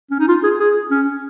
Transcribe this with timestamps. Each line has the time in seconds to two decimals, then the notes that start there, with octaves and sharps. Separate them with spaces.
0.11 C#4
0.19 D#4
0.28 F4
0.44 G#4
0.60 G#4
0.90 C#4